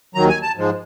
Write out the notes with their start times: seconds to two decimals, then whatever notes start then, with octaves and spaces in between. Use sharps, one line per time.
0.15 D#2 D#3 F#3 A#5
0.29 G#5
0.42 A5
0.56 G#2 F3 G#3